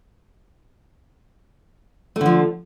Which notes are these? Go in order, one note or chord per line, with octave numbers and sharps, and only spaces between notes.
D3 F3 A3